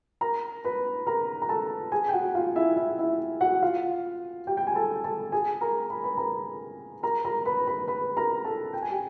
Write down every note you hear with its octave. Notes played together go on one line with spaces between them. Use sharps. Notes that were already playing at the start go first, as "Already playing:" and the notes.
A#4 A#5
B4 B5
A#4 A#5
A#5
A4 A5
G#4 G#5
G5
F#4 F#5
F4 F5
E4 E5
E4 E5
E4 E5
F#4 F#5
F4 F5
G4 G5
G5
G#5
A4 A5
A4 A5
G#4 G#5
A#4 A#5
B5
B4 B5
A#4 A#5
A#4 A#5
A#4 A#5
B4 B5
B4 B5
B4 B5
A#4 A#5
A4 A5
G5
G#5
G4 G5